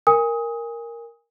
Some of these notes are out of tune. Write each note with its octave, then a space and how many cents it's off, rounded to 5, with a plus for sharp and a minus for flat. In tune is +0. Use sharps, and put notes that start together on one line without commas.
A#4 +0 G#5 -25 D#6 +20